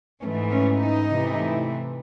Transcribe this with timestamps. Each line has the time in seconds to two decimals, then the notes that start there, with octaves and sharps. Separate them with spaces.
0.22 G#2 E3 A3 C#4
0.51 C#4
0.79 D#4
1.07 C3 E3 A3